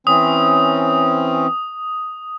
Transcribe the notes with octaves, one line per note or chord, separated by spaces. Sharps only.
E3 C4 C#4 D#6